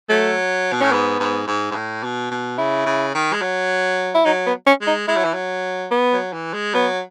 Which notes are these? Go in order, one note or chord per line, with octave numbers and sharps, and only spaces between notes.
F#3 A3
B2
A2 C#4
G#2 B3
G#2
G#2
G#2
A2
B2
B2
C#3 E4
C#3
D#3
G#3
F#3
E4
F#3 D#4
B3
C#4
G#3
D#4
G#3 E4
F#3
E3
F#3
B3
F#3
E3
G#3
F#3 B3